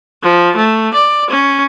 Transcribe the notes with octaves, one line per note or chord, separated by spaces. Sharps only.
F3
A3
D5
C#4